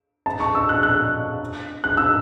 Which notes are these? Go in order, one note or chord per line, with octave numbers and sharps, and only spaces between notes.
A5
C#6
E6
F#6
F#6
F#6
E6